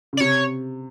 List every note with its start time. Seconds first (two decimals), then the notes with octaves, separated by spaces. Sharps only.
0.13 C#3
0.17 D5
0.20 C3 C#5